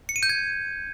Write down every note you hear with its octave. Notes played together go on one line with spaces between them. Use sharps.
C#7
D#7
G6
G#6